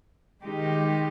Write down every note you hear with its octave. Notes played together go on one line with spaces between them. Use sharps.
D#3 G#3 D#4 G4